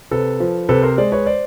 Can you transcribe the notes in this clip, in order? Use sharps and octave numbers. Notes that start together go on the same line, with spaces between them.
C3 A4 B4
F3
C3 A4 B4
A#4 C5
G#3 C5 D5
B4 C#5
C5 D5